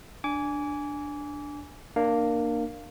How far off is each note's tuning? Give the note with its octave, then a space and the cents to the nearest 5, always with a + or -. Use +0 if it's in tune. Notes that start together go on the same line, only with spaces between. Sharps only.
D4 +0 G#5 +0 D6 -30
A#3 +0 D4 +30 F5 +0